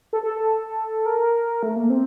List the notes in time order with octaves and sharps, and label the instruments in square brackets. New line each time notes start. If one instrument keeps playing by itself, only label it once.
[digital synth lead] A4
A4
A#4
A3
A#3
C4